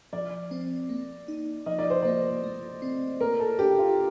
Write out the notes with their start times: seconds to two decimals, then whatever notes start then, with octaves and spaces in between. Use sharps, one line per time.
0.13 F3 D5
0.51 C4
0.89 A#3
1.28 D#4
1.66 F3 D#5
1.79 D5
1.90 C5
2.02 A#3 D5
2.43 A3
2.82 C4
3.20 A#3 A#4
3.40 A4
3.59 D4 G4
3.79 F4